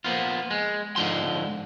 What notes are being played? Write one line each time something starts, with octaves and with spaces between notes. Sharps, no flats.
F3 A#3 B3 F4
G#3
G#2 D3 F3 C6